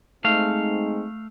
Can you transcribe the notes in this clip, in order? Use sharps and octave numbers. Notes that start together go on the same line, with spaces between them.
G#3 A3 C4 D#4 F5